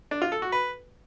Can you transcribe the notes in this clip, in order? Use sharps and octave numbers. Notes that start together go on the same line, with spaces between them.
D4
F4
A4
F#4
B4